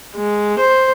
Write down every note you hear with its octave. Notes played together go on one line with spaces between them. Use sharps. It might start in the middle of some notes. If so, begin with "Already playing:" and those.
G#3
C5